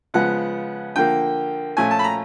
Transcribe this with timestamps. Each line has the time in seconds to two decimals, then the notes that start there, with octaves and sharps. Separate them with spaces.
0.14 C#3 F3 G#3 B3 F#5
0.96 D3 F3 A#3 G5
1.77 A#2 F3 A3 C#4 G#5
1.91 A5
1.99 B5
2.04 A#5